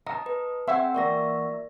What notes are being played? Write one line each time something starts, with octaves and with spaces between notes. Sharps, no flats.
D#5 A5 A#5
B4
C4 G#4 C5 E5 F#5 G5
E3 A#3 F#4 A#4 D5 A#6